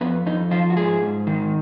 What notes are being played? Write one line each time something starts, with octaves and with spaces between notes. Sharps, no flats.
F2 B3
F2 D#4
F3 F4
F#4
G#2 G#4
G#2
D#3